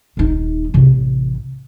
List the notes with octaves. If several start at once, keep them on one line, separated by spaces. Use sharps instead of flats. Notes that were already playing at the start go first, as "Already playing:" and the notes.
D#1 D#4
A1 C3